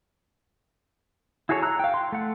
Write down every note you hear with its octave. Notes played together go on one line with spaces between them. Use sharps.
E4 F#4 G#4 A4 C#5
A#5 E6 F#6
F5 G5
C6
A3 F#5